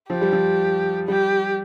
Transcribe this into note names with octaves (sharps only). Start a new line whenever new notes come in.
F3 G4
G3
F3
G3 G4